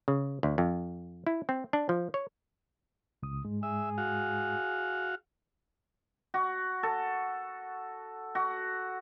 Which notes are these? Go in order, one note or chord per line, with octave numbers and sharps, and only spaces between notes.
C#3
D2
F2
E4
C4
D4
F3
C#5
C#2 D#6
G#2 G#3
G#4 E5
F#4 F5
F#4
A4
F#4